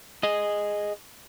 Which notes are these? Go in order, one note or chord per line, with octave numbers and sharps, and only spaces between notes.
G#4 D#5